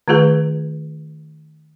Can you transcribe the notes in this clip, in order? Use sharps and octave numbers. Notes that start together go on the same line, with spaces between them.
D#3 A3 F4 G#4 B4